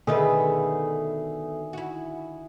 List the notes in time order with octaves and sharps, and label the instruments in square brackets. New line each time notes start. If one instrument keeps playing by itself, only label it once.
[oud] B2 A3 B4 [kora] D3 D#3 [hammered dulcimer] G#4 E5
[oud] E4 F#4